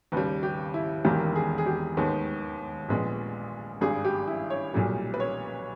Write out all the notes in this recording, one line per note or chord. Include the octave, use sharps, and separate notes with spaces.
D#2 C#3 G3 B4
G4
E4
E1 E2 D#3 A#3 G4
G#4
G#4
G4
D#2 D#3 G#3 B3
A#1 A#2 G#3 B3
G#1 G2 G3 G#4
G4
E4
C#5
B1 A#2 G3
B4
C#5